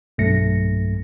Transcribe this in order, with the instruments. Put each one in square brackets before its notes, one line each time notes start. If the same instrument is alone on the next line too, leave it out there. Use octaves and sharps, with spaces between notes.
[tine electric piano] B1 G2 A3 A#6 C#7